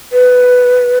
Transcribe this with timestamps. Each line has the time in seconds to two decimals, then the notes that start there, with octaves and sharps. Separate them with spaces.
0.13 B4